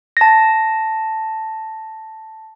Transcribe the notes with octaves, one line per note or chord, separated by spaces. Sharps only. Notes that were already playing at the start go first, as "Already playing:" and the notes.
A5 A#6